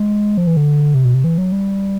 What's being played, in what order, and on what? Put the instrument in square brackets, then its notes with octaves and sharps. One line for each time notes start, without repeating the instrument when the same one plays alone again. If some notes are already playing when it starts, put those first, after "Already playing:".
Already playing: [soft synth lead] G#3
F3
E3
D3
C3
B2
C3
E3
F#3
G3